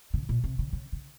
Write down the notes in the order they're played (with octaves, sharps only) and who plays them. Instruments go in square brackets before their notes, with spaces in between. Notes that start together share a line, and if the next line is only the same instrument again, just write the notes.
[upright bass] C#3
A#2
C3
C#3
C#3
C#3